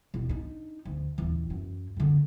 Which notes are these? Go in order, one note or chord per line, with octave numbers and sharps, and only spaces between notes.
E1
D4 D#4
D2
D#1 E3
F#2
F#2 D3